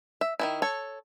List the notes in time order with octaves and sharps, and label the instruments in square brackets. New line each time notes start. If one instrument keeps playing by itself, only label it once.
[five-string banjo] E5
D#3 E3 E4
A4 C#5